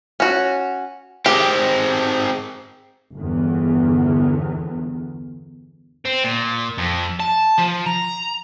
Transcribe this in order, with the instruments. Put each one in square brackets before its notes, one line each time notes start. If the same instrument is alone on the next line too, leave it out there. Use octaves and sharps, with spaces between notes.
[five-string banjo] C#4 F#4
[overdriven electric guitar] G#3 C4 [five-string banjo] G4
[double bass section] G1 E2
[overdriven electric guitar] C4
A#2
F2
A5
F3
A#5